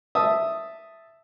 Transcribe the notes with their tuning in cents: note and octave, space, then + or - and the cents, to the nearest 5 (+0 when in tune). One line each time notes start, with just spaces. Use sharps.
E5 +0 A5 +0 D#6 +0